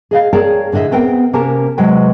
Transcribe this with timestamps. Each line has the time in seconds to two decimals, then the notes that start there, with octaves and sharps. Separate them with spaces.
0.11 G#4 D#5 F5
0.33 G#4 A#4 C#5 D5 G5 A5
0.72 A2 D3 G#4 D#5 E5
0.92 B3 C4 A#4 G5
1.33 C3 A#3 C#4 G4 A#4 A5
1.78 C3 F#3 G#3 B4 G5